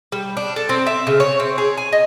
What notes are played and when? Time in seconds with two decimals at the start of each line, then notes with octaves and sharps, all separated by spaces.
0.12 G3
0.37 D4
0.56 A4
0.69 C4
0.87 E5
1.07 C#3
1.20 C#5
1.40 C4
1.58 G#4
1.77 G#5
1.92 D#5